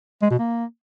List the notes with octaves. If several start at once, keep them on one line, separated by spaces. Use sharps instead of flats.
G#3
B2
A#3